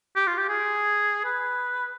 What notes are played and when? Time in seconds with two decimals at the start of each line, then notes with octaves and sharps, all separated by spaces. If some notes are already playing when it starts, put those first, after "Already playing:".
0.16 G4
0.27 F4
0.38 G4
0.49 G#4
1.25 B4